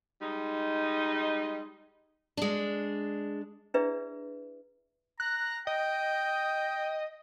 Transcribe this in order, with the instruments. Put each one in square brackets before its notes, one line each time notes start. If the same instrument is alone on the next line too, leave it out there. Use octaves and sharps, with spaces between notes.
[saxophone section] G3 G#3 D#4
[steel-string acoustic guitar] G#3 D4
[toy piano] D4 E4 G#4 B4 D5 E5
[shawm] A#5 [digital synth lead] F#6
[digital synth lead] D#5 [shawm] G5